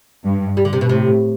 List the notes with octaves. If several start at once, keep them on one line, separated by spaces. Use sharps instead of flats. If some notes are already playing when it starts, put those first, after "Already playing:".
G2
G3
D3
C3
B2
A2 C3